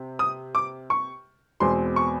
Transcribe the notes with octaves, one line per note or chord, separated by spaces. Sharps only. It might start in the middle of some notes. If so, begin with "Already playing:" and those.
Already playing: C3
D#6
D6
C#6
E2 B2 G#3 C4 C6
C#6